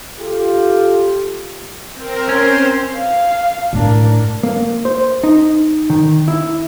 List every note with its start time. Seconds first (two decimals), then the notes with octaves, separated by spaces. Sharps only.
0.20 F4 G4 A4
1.95 C4 A#4
2.29 C#4 C5 C6
2.96 F5
3.73 A2 D4 A#4
4.43 A#3
4.85 C5
5.24 D#4
5.90 D#3
6.28 E4